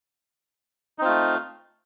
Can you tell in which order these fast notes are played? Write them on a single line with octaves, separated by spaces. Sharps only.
D#4 C4 F4 A3